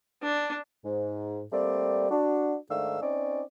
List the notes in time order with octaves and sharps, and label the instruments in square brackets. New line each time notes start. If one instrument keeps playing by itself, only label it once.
[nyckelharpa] D4
[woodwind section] G#2
G3 A3 A#3 C4 D5
D4 F#4
G#2 D#3 A3 D4 F5 E6
C4 C#4 D#4 C#5 D5